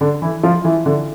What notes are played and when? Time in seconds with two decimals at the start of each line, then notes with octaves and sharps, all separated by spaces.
0.01 D3 D4
0.22 E3 E4
0.43 F3 F4
0.64 E3 E4
0.86 D3 D4